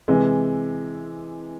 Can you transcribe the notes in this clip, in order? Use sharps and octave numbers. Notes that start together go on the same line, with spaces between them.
C3 E3 G#3